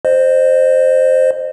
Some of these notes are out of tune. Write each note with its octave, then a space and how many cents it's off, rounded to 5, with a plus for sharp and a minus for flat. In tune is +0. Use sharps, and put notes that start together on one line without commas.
C5 +0 D#5 -30